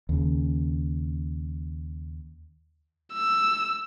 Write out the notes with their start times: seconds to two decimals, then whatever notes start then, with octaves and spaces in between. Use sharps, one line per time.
0.09 D#2 C#3
3.13 E6